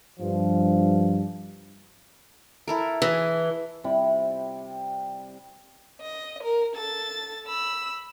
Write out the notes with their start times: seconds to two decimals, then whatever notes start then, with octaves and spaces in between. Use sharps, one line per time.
0.19 G2 F3
2.68 E4 A4 A#4
3.02 E3 G#4 A5
3.84 C3 G3 E4 B5
6.01 D#5
6.43 A#4
6.75 A4 A6
7.46 B5 E6